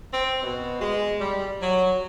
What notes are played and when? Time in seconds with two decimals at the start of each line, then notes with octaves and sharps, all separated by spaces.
0.14 C4
0.43 B2
0.81 G#3
1.21 G3
1.61 F#3